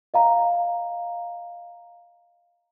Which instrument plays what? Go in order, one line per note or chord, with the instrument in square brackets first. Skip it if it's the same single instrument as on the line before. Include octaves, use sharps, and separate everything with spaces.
[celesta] D#5 F5 A#5